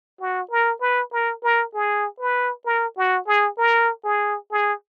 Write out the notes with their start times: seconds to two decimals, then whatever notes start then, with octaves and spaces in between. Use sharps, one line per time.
0.20 F#4
0.51 A#4
0.81 B4
1.13 A#4
1.43 A#4
1.74 G#4
2.20 B4
2.65 A#4
2.97 F#4
3.27 G#4
3.58 A#4
4.04 G#4
4.51 G#4